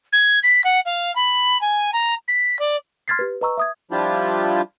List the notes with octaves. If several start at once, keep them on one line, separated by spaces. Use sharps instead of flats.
G#6
B6
F#5
F5
B5
G#5
A#5
B6
D5
C6 F6 G#6 A6 B6 C7
G4 B4
B4 D#5 A#5 C#6 E6
E5 D#6 G#6
F3 G3 D4 E4 F4 G4